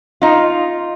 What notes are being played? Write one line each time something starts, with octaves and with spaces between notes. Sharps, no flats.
D#4 F4